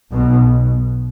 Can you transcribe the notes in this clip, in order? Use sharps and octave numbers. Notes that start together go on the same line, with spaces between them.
B1 B2